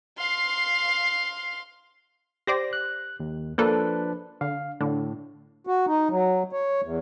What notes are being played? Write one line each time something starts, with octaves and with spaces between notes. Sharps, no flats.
F5 C6
G4 C5 D5 A#6
F#6
D#2
F3 A#3 D4 A4 B4
D3 F5
A2 D3
F#4
D#4
F#3
C#5
E2